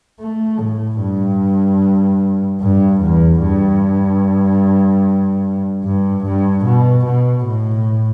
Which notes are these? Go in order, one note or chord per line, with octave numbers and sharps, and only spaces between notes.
A3
A2
G2
G2
E2
G2
G2
G2
B2
B2
A2